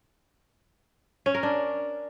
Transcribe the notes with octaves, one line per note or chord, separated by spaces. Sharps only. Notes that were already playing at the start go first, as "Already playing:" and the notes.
C#4
A#4
D4